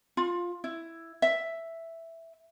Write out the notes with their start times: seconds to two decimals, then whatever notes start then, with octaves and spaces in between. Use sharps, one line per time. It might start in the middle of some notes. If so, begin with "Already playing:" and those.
0.17 F4
0.64 E4
1.22 E5